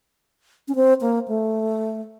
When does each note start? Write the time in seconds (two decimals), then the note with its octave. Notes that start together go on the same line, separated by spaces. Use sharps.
0.68 C#4
0.75 C4
1.01 A#3
1.28 A3